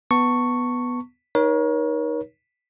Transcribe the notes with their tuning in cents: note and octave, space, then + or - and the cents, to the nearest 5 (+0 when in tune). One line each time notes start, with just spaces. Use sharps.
B3 +0 A5 +30 C#6 +0
D#4 +0 A#4 +40 C#5 +0